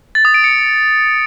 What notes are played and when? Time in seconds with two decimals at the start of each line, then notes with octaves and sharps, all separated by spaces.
0.15 A6
0.25 D#6
0.34 D7
0.44 C#7